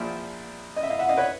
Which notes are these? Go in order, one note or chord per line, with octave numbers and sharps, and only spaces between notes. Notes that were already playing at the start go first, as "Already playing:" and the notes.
Already playing: A#1 A#2 F3 D5 E5
D#5
E5
D#5 F5
E5 F#5
D#5 F5
B4 C#5